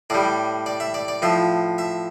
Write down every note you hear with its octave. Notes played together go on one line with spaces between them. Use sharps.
A2 G3 D5
D5
E5
D5
D5
A2 F3 E5
E5